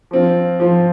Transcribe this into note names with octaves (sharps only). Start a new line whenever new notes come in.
F3 C4 F4
F3 C4 F4